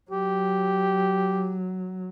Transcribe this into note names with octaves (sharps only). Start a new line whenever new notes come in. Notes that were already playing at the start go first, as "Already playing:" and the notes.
F#3 G4